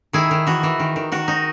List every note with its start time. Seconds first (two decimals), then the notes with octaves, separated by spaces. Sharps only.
0.13 D#3 E4 G#4
0.31 D#3
0.46 E3 F#4
0.63 E3
0.80 D#3
0.96 D#3
1.12 D#3 F#4
1.28 D#4